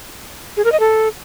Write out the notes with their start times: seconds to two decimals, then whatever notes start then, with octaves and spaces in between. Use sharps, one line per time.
0.57 G#4
0.64 A#4
0.72 D#5
0.80 A4